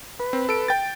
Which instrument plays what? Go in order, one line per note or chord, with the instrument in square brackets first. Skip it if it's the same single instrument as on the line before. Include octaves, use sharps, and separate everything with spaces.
[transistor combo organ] B4
[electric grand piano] C4
A4 D7
G5 A6